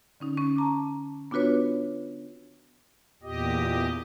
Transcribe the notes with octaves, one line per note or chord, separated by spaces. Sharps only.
D3 C#4 D#4
C#4 C#6
A5 A#5 D6
B3 D4 F4 F#4 B4 C#5
E2 A#2 G4 D#5